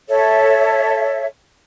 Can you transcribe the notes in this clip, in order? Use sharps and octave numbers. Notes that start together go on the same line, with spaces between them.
A4 C#5 E5